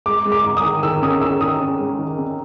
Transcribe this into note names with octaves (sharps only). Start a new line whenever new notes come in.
G#3 D6
G#3
D6
G#2
D#6
D#3
D#3 E6
C#4 D#6
D#3 E6
D#3 D#6
C#4
G#3
D#3
C#4